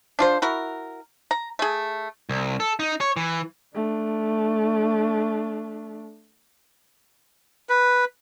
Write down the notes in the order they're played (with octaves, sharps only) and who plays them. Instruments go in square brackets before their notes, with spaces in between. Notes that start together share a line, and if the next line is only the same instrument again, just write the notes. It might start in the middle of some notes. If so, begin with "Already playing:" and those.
[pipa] D4 F4 C5
E4 F#4 A#4
A#5
A3 G#4
[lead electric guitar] C2
A4
D#4
C#5
E3
[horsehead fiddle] A3 D4
[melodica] B4